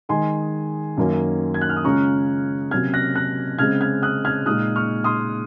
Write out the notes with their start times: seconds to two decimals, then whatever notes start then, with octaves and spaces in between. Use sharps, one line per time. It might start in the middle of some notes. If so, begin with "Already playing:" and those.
0.09 D#3 G#3 D#4 G#5 C6
0.97 F#2 D#3 F#3 A#3 C#4
1.54 G#6
1.61 F#6
1.69 F6
1.76 D#6
1.84 C#3 G#3 C#4 F4 A#5 C#6
2.71 C3 F#3 A#3 C#4 F6 G#6
2.94 F#6 A#6
3.15 F#6 A#6
3.59 C#3 G#3 C4 F6 G#6
3.81 F6 G#6
4.02 D#6 F#6
4.25 F6 G#6
4.46 A#2 G#3 D#4 D#6 F#6
4.76 C#6 F6
5.04 C6 D#6